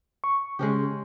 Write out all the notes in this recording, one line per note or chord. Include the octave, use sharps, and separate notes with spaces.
C#6
C#3 G#3 C#4 G4